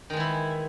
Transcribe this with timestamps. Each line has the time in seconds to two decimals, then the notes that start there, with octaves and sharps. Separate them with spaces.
0.10 D#3
0.13 G#3
0.17 E3
0.20 E4